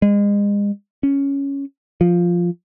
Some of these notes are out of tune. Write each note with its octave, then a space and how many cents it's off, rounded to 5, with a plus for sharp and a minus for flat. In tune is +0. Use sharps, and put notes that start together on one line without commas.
G#3 -35
C#4 +5
F3 +0